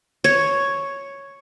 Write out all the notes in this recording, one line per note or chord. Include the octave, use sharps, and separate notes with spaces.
C#5